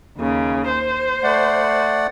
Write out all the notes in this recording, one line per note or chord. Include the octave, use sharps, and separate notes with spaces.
D#2 C#3
C5
A3 D5 F#5